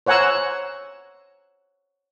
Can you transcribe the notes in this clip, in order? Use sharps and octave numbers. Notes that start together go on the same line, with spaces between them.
C5 C#5 F#5 G#5 A#5 E6